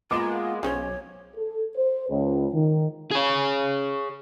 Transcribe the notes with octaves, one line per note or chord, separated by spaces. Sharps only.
G#3 A#3 B3 F4 D6 E7
B1 C#3 C#4 C5 C#5
A4
C5
C#2
D#3
G#4 C#5